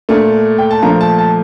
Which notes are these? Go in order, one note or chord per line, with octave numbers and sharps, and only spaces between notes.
A#2 A3
G5
A5
A#2 F3 A3 A#5
A5
A5